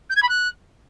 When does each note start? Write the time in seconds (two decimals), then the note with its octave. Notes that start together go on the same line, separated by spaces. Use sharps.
0.10 G6
0.16 G#6
0.22 B5
0.29 F#6